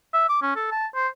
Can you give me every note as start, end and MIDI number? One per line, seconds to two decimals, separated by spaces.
0.13 0.25 76
0.29 0.39 86
0.42 0.54 61
0.56 0.70 69
0.71 0.86 81
0.95 1.08 72